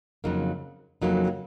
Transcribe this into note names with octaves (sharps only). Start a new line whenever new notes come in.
F2 C#3 F#3 A#3 D#4
F2 C#3 F#3 A#3 D#4